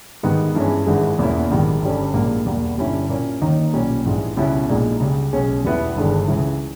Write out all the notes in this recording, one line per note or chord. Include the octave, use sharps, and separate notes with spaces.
G#2 D#3 G3 B3 D#4
G2 E3 G#3 C#4
G#1 G2 E3 G#3
E2 B2 A#3 C#4 E4
A#1 G#2 D#3 G3
G1 G2 G3 C#4
A#1 G#2 G3 A#3
E2 B2 G3 A#3
G1 G2 G3 C#4 E4
A#2 A#3 C#4
D#2 D#3 A#3 D#4
B1 A#2 G3 C#4
A#1 G#2 E3 G#3
C#2 B2 G3 C#4 E4
A#1 A#2 G#3 D#4
C#2 C#3 G3
B1 B2 G#3 C#4
E2 B2 G3 B3 E4
G1 G2 D#3 G#3
C#2 C#3 E3